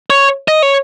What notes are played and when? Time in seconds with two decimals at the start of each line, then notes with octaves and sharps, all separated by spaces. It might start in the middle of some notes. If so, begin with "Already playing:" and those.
0.10 C#5
0.48 D#5
0.63 C#5